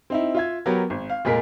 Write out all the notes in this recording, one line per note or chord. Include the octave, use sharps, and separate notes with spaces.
C4 D#4 E4
F4 E5 G#6
F#3 B3 G4 A#4 B4
G#1
F5
F1 A#2 G#3 G#4 A#4 B6